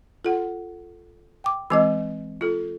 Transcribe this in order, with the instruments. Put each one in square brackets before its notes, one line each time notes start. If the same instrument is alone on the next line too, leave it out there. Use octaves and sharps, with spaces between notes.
[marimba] F4 [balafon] A4 F#5
[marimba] G5 D6
[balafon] E3 G#3 C4 [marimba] D#5 D6 E6
[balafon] F4 A4